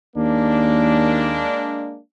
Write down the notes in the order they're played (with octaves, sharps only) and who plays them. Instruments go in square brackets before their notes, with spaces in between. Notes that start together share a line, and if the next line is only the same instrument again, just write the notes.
[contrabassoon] D#2 [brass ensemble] G#3 A#3 D4